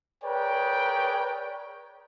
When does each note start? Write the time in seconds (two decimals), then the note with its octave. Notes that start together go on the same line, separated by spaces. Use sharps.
0.24 G#4 A#4 B4 C#5 D5 G5